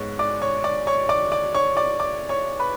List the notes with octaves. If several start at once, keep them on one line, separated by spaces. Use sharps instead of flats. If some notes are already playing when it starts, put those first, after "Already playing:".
Already playing: G#2 G#3 B3 C#5 C#6
D5 D6
C#5 C#6
D5 D6
C#5 C#6
D5 D6
D5 D6
C#5 C#6
D5 D6
D5 D6
C#5 C#6
B4 B5